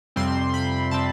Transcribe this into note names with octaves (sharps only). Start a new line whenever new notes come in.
F2 C3 G3 C4 C6
B5
C3 G3 C4 A5